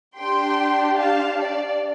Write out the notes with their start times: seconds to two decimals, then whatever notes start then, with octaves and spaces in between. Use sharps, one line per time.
0.16 D4 G4 G5 C6
0.97 F5 A5
1.38 D5